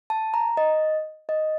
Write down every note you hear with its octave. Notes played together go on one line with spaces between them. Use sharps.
A5
A#5
D#5
D#5